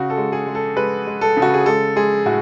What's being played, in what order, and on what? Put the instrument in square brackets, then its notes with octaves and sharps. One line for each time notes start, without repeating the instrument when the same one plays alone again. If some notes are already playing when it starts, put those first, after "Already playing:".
Already playing: [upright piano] C#3 F#4
A4
G#3
G#4
G#3
A4
G#3 B4
G#3
A4
C#3
F#4
G#4
G#3 A4
G#3 G#4
A2 F#4